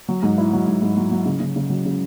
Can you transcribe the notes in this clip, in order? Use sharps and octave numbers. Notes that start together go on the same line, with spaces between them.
F#3
G#2
E4
F#3
G#2
G#2
F#3
F#3
C#3
C#3
C#3
F#3
C#3